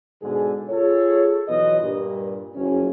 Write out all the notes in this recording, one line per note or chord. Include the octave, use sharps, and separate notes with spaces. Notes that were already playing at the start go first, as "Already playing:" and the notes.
G#2 B2 D3 G#3 G#4
F4 G#4 A4 C#5
B1 E2 F3 B4 C#5 D#5
G2 A#2
F#1 F2 C#4